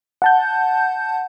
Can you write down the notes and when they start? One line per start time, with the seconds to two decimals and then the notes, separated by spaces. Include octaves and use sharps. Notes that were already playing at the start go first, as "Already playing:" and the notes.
0.22 F#5 A5 G6